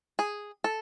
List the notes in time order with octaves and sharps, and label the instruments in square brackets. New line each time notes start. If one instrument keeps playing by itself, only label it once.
[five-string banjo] G#4
A4